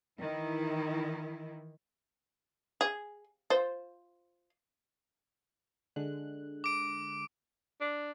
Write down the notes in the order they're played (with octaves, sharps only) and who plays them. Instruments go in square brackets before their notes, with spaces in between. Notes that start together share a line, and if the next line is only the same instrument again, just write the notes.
[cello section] D#3 E3 E4
[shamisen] G#4
F4 C5
[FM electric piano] D3 G#3 F#6
[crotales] D6 D7
[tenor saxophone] D4